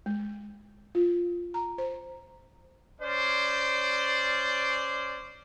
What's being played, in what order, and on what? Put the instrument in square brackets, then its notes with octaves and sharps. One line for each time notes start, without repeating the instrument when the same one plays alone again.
[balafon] G#3
F4
A#5
C5
[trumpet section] C#4 C5 D5